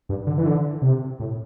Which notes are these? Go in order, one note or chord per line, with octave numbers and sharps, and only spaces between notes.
G2
D3
E3
D3
C3
A2